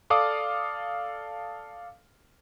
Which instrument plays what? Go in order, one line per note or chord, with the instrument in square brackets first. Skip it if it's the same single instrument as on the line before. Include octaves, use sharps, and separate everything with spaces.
[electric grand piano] A4 D5 F5 D6 D#6 F6